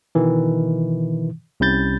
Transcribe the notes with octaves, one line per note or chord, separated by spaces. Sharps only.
B2 D#3 E3
C2 C3 C#4 B5 G6 A6